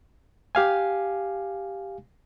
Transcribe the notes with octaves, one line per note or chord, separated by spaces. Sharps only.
G4 F5 G#5